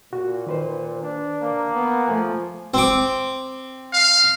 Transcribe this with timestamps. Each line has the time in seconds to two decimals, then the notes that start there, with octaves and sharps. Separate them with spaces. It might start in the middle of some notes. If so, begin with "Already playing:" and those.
0.13 A#2 F#4
0.47 D#3 B4 C5
1.02 D4
1.43 A#3
1.74 B3
2.08 F3 A3 G#5
2.74 C4 D6
3.93 F5